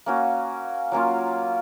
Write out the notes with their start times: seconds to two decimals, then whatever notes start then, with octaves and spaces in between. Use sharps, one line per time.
0.06 A#3 C#4 F#4
0.92 F#3 A#3 C#4 F4